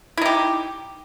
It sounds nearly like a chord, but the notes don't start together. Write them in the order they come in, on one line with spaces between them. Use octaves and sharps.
E4 D#4 G4